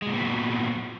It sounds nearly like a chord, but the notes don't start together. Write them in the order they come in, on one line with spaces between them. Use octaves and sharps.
G#3 A#2 C4 B3 F#3